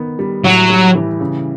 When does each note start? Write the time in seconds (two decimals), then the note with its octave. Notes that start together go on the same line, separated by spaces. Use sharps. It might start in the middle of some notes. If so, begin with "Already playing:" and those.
Already playing: D#3 B3
0.19 G3
0.44 A2 F#3
0.70 G3
0.95 E3
1.20 C#3